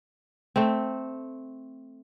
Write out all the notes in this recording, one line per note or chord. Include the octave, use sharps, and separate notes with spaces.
A3 C4